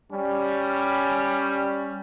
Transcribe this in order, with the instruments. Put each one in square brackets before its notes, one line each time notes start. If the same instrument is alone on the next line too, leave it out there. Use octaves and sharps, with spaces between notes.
[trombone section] G3 C#4